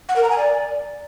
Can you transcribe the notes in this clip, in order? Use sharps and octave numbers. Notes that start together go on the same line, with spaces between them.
F#5
A#4
A#5
G#5
D5